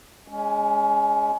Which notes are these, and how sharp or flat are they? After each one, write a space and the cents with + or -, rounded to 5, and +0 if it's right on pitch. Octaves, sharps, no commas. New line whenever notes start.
G#3 +0 C#4 +30